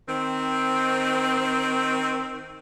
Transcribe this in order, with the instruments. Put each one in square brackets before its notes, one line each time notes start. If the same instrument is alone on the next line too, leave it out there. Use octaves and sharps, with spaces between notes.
[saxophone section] D#3 C4